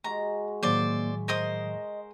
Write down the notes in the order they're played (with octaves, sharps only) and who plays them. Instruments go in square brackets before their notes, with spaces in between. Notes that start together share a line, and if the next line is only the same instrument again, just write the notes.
[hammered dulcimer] G#3 F#4 G#5 [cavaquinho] A#5
[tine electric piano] A2 D#3 F#3 [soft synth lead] A#3 [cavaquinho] C5 D5 [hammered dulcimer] E5
[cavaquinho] A#4 C5 D#6 [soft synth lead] D#5